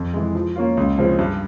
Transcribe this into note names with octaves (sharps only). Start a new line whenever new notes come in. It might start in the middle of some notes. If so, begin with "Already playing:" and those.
Already playing: F2
E3 G#3
F3
A#3 C#4 F4
C#2
C#3 F3 G#3 C4
G2